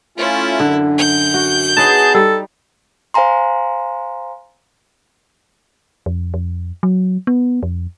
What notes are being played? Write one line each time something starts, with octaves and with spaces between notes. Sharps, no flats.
A3 C#4 E4 F4
F#2 D3
G6
F#4
B3 D#4 G#4 B4 C#5 A5
G3 D#4 A4
C5 F5 G#5 A#5 C6
F2
F2
F#3
B3
F2